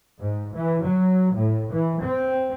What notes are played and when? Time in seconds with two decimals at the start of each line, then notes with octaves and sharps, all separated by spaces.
0.20 G#2
0.55 E3
0.83 F#3
1.36 A2
1.73 E3
2.03 C4